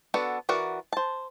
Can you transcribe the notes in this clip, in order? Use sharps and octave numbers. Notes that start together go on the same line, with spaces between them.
B3 D4 F#4 A4
E3 F#4 A#4 D5
C5 A5